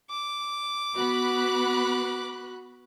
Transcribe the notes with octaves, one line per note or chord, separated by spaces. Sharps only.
D6
B3 F#4 B5 F#6